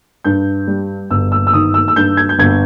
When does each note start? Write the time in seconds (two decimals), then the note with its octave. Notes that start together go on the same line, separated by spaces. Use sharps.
0.24 G2 G6
0.67 G3
1.11 G1 E6
1.32 E6
1.47 E6
1.53 D#3 D#6
1.74 E6
1.88 E6
1.96 G2 G6
2.17 G#6
2.29 G6
2.39 G1 G#6